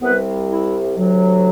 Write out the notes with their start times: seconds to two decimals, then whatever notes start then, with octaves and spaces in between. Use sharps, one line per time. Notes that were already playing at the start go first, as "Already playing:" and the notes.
0.01 C2 C3 G3 B3 B4
0.48 E4
0.96 D2 C3 F#3